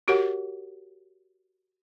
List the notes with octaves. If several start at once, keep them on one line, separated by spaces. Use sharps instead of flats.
F#4 G4 A#4 C#5 F#5